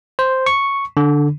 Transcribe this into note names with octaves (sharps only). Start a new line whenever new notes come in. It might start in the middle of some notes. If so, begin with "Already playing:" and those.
C5
C#6
D3